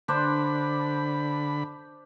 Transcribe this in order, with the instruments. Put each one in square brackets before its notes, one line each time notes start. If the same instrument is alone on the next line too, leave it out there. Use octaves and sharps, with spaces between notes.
[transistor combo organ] D3 B5 [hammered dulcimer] D4 C5 D5